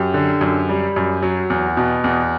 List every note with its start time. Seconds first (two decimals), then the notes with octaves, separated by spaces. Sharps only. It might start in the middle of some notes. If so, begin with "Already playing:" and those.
Already playing: F#2 G4
0.14 D3
0.41 F#2
0.69 G3
0.96 F#2
1.22 F#3
1.50 E2
1.77 B2
2.04 E2